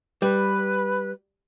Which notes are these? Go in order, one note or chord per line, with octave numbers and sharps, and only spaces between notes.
G3 B4